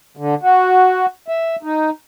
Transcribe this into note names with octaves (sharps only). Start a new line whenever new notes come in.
D3
F#4
E5
D#4